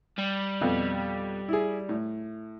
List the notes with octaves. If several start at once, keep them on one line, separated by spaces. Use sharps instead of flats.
G3
F2 B2
E4 G#4
A2